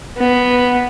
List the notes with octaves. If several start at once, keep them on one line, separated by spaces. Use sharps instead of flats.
B3